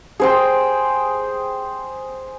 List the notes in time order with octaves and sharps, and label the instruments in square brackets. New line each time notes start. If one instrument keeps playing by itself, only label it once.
[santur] G#4 C5 G5